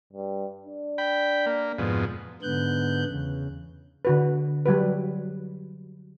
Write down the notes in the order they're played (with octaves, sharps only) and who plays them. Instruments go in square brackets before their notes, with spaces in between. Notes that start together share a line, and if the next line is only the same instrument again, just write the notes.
[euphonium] G2
D4
[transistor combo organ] G5 B5
A#3
F2 G#2 B2
[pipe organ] G#2 D3 B3 F#6 G6
E2 C#3
[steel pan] D3 F#4 B4
F#3 G3 F#4 B4